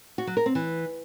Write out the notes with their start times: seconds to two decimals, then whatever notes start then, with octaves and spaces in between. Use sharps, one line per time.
0.18 F#4
0.27 F#3
0.37 A#4
0.46 C4
0.55 E3